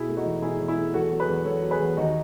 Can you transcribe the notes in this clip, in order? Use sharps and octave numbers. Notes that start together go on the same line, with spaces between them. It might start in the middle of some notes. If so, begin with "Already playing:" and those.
Already playing: B2 E4 G#4
A3
D#4 F#4
E2
B2 E4 G#4
E2
E4 G#4
A3
E2 F#4 A4
F#3
G#4 B4
E2
E2 A4 C#5
F#3
G#4 B4
E2
D#2 D#4 F#4